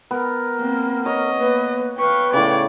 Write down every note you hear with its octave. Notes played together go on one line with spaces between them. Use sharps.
B3 A#4
A#3 C4
C#5 D#5
A#3 B3 B4
B4 F5 G5 C#6
A2 C#3 C#5 D5